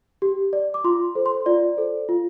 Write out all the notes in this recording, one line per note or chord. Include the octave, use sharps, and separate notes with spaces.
G4
D5
D6
F4 C6
A4 C5
C6
F4 D5
A4 C5
F4